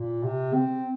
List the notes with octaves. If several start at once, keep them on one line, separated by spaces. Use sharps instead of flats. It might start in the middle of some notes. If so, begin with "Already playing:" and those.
Already playing: A#2
C3
C4